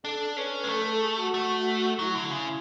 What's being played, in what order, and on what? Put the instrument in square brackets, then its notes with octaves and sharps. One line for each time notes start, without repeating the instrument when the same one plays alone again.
[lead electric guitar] D4 [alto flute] A4
[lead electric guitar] C#4 [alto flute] B4
[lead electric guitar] G#3
[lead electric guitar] A3 [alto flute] A4
[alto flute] A4
G#4
F#4
[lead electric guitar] A3
[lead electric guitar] F#3 [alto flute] E4
[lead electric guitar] D3
C#3